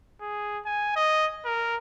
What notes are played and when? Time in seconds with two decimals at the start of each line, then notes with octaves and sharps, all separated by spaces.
0.21 G#4
0.66 G#5
0.96 D#5
1.45 A#4